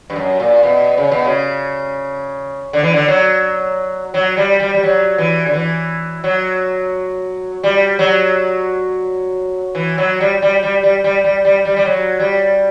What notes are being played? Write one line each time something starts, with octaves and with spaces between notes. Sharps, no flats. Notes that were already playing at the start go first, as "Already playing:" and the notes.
G2
F#2
A#2
B2
C#3
B2
C#3
D3
E3
D3
F#3
F#3
G3
G3
G3
F#3
E3
D3
E3
F#3
G3
F#3
E3
F#3
G3
G3
G3
G3
G3
G3
G3
G3
G3
F#3
G3